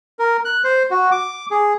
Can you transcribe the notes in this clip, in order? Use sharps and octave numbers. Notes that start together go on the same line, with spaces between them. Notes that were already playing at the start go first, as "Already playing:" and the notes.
A#4
F#6
C5
F#4
D6
G#4